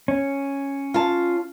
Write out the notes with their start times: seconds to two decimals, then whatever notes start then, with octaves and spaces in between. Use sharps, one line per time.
0.08 C#4
0.94 F4 A5